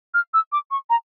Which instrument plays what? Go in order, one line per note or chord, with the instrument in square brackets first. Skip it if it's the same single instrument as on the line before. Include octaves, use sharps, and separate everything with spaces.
[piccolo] F6
E6
D6
C#6
A#5